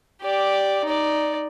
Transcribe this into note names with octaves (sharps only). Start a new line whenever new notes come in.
G4 D5
D#4 D5